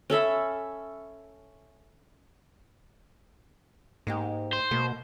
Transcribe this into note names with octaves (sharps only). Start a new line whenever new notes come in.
C#4 A4 E5 B5
G#2 A#3 D#4 G4
C5
B2 A#3